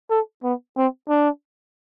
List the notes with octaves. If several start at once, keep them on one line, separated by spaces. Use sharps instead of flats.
A4
B3
C4
D4